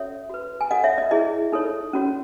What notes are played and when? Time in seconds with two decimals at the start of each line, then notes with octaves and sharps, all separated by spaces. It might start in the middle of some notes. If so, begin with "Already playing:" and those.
Already playing: C#4 F#4 A4 C#5 E5
0.30 F#4 B4
0.61 G#5
0.71 F#4 A4 C#5 D#5 F#5
0.84 C#5 E5
0.98 D#5
1.11 E4 G#4 C#5 D#5
1.53 D#4 A4 C#5
1.93 C#4 F#4 C#5